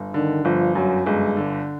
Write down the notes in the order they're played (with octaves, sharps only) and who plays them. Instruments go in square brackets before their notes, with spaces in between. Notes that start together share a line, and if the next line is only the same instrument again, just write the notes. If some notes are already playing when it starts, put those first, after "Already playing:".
Already playing: [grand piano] G1
[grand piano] D3 [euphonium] D#3
[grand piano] G1 [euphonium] F3
[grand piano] F#2 [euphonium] F#3
[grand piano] G1 [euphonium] G#3
[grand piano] D3